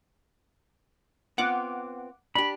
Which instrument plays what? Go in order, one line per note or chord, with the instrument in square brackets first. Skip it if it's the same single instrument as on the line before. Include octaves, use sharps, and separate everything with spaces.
[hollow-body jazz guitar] B3 C4 F4 [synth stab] F#5 D6
[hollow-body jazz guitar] D4 G4 [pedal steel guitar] B5